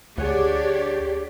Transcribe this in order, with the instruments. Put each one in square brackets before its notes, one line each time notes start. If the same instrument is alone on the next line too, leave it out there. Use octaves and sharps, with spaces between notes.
[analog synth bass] D2 [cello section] D4 C#5 D5 [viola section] G4 [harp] G#4 F#5